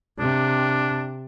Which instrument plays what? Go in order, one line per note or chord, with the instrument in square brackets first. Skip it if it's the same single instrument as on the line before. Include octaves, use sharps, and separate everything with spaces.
[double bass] C3 [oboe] D4